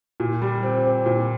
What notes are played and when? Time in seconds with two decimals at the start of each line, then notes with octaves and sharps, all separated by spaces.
0.20 A#2
0.42 G3
0.63 C4
0.85 C4
1.06 A#2